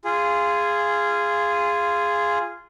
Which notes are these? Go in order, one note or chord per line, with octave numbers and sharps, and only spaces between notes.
F4 G#4